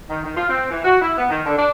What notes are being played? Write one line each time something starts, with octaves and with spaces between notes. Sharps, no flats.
D#3
D#3
F4
C4
E3
F#4
E4
B3
D#3
D3
D4